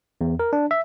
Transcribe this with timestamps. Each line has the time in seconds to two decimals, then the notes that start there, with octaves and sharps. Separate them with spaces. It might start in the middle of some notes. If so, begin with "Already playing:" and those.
0.21 E2
0.40 A#4
0.53 D4
0.71 E5